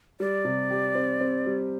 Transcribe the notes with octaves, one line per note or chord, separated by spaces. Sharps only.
G3 D5
C3
G4
C4
C4
G3